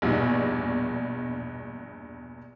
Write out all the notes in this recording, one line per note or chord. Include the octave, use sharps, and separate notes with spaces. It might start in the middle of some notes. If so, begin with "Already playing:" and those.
A#1 E2 G2 B2 D#4